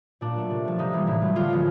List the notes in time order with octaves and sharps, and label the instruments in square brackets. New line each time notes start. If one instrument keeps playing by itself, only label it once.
[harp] A#2 D4
F#3 A3
C3
F3 A3
C3 D#4
E3 G3 A#3
A2 E4
F#3 A3
D3 F4
F3 G#3 B3